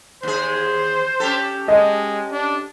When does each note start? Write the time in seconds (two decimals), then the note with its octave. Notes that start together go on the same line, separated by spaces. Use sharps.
0.23 D#2 G#4 C5
1.20 C#4 G4 A4
1.68 G#3 D#5
2.32 D4